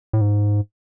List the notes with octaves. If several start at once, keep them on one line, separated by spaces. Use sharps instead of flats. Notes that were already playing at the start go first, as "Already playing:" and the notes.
A2
G#2